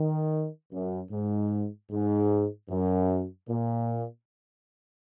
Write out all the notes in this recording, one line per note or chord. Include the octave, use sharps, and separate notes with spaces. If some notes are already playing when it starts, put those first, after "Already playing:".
Already playing: D#3
F#2
G#2
G#2
F#2
A#2